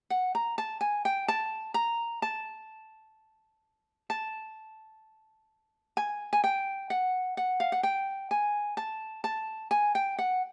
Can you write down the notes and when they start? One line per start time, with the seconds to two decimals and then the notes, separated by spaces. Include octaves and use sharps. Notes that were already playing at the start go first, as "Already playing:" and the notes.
0.10 F#5
0.35 A#5
0.58 A5
0.81 G#5
1.05 G5
1.28 A5
1.74 A#5
2.22 A5
4.10 A5
5.97 G#5
6.33 G#5
6.44 G5
6.90 F#5
7.37 F#5
7.60 F5
7.72 F#5
7.83 G5
8.31 G#5
8.77 A5
9.24 A5
9.71 G#5
9.95 G5
10.19 F#5